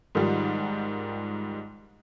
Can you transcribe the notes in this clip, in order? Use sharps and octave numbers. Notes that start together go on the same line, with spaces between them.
G#2 D#3 F3 G3